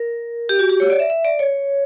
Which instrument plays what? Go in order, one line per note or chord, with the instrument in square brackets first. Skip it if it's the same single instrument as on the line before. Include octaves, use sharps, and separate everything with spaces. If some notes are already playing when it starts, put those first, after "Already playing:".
Already playing: [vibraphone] A#4
G4
F#4
G4
C#5
D5
E5
E5
D5
C#5